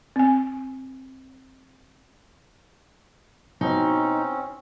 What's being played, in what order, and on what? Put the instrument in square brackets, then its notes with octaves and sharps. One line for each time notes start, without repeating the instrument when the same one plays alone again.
[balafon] C4 G#5
[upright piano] G#2 B2 [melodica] C4 C#4 [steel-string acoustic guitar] D#4